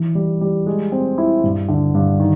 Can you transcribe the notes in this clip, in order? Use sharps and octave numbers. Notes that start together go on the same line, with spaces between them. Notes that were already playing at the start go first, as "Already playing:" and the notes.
Already playing: E3
G3
G3
G#3
C4
E4
G2
D3
G2
D#3